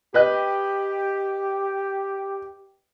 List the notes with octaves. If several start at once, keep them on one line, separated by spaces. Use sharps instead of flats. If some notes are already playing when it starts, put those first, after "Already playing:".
G4 B4 D#5 F#6